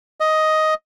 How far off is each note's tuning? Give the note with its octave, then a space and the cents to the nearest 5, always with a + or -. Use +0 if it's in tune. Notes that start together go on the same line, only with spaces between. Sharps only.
D#5 +10